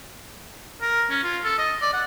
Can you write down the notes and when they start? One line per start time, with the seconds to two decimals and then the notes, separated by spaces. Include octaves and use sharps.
0.81 A#4
1.10 C#4
1.24 F4
1.44 A4
1.58 D#5
1.82 D5
1.93 F#5